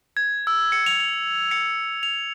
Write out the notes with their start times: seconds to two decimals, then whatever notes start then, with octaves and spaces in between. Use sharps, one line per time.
0.17 G#6
0.47 E6
0.72 C#7
0.86 F7
1.00 F7
1.51 C#7
2.03 F7